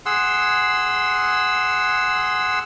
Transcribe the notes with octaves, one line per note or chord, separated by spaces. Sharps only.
G#4 F#5 C6 E6